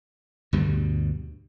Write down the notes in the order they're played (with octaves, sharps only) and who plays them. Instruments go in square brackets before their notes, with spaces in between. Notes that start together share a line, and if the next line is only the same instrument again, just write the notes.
[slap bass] D2 G2 B2 G3